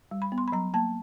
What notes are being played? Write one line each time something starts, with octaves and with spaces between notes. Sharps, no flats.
G3
B5
B3
C6
B5
F#3 A#5
A#3 A5